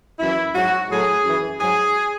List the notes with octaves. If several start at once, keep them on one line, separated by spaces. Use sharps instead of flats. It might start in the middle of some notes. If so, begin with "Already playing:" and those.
F#2 E3 E4
G#2 F#3 F#4
A2 F#3 G#4
F#2 E3
G#2 F#3 G#4